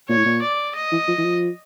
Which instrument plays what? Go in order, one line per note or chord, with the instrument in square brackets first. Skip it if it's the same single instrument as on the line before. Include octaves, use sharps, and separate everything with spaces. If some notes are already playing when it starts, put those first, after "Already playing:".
[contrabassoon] A#2 [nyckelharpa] C#5
[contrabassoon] A2
A#2
[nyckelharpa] D5
D#5
[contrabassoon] E3
F3
E3
F3